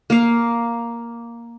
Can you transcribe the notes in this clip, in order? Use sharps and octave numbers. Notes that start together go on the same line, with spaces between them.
A#3 F5